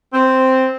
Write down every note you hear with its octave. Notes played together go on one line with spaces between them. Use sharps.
C4